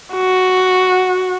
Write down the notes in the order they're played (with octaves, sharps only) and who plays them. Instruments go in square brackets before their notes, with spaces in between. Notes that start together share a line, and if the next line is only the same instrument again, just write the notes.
[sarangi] F#4